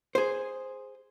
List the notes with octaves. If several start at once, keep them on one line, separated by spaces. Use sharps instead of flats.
G#4 C5